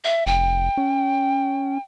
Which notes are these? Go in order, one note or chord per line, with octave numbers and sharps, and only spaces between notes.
E5
F1 G5
C#4